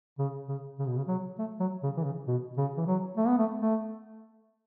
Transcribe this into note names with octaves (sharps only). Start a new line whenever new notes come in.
C#3
C#3
C#3
B2
C#3
F#3
A3
F#3
C#3
E3
C#3
B2
C#3
E3
F#3
A3
B3
A3
A3